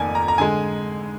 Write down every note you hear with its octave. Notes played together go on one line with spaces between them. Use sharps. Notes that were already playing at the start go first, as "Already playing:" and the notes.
Already playing: F1 F2 D#3 A#3 D5 G#5
A#5
A#5
D3 G#3 G#5